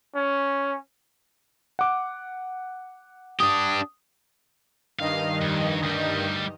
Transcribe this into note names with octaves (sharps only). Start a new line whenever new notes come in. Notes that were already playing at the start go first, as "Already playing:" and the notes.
C#4
F#5 D6
D4 G4 D#6
G2 D#3 D#5 F5
F2
D2 G3